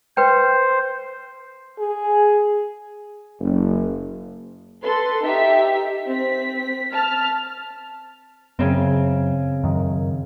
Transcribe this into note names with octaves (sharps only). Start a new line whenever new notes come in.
B4 C5 G5
G#4
F#1
A4 B4 C6
D#4 G4 E5 B6
C4 B6
A5 F6
F#2 C#3 C4
F#2 D#3